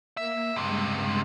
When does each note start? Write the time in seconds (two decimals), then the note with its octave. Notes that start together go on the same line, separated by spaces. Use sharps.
0.17 A#3 E5
0.56 C#2 G2 C3 G#3